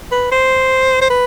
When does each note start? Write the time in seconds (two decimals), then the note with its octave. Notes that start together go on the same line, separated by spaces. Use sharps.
0.12 B4
0.32 C5
1.01 C5
1.10 B4